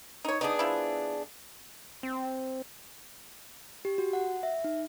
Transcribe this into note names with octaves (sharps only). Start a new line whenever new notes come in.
D#4 C#5
B3 D4 D#4 G#4
F3 E4
C4
G4
F#4
F#5
E5
D#4